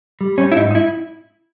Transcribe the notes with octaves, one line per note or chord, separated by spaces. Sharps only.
G3
G3 C#4
E4
G#2 D#4
D#4
E4